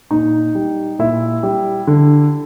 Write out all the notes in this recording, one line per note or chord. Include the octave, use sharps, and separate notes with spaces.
A#2 D#4
G3
A#2 E4
G3
D3